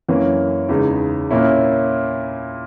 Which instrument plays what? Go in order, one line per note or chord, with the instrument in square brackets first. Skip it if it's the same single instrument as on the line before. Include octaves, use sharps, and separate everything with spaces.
[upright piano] F#2 E3 A#3 C#4
E2 C#3 G#3 D#4
A#2 A#3 C#4 E4